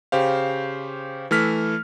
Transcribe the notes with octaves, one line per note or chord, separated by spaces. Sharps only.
C#3 G4 C5 F5
E3 A3 F6 B6